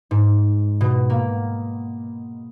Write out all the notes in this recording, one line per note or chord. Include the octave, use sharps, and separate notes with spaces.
G#2
B2
A#3